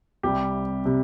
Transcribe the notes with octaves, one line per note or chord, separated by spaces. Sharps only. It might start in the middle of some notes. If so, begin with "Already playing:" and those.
C2 C3 G3 G4
C3 G3